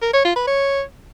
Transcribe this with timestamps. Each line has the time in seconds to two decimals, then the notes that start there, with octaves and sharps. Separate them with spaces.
0.02 A#4
0.13 C#5
0.25 F4
0.36 B4
0.47 C#5